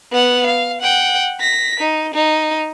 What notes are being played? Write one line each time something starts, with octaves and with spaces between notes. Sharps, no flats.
B3 F#5
F5
F#5 G5
A#6 B6
D#4
D#4